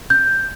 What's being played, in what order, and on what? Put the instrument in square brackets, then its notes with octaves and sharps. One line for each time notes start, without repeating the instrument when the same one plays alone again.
[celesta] G6